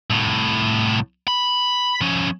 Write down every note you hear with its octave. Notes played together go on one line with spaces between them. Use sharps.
C2 A2
B5
F3 C#4